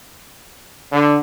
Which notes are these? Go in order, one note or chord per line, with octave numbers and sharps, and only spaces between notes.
D3